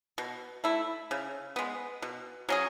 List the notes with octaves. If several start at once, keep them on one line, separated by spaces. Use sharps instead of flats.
B2
A3 E4
C#3
G#3 B3
B2
F#3 C#4 G#4